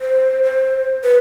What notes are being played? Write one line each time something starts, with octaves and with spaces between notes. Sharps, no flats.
C5
C5
B4